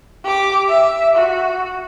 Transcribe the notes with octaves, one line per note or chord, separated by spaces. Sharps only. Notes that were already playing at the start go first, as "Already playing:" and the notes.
G4 D6
E5
F#4